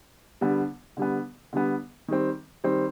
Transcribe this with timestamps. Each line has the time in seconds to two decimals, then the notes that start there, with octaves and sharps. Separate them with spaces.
0.41 D3 G3 B3
0.97 D3 G3 B3
1.53 D3 G3 B3
2.08 D#3 G3 C4
2.64 D#3 G3 C4